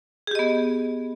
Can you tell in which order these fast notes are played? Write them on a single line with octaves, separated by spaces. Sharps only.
G#4 G4 D#5 B3